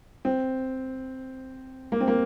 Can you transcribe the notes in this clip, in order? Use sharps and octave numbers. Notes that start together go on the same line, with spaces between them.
C4
A#3
C4
A#3